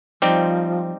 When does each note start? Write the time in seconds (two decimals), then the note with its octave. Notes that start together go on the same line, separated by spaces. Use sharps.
0.22 F3 G3 C4 D#4 G4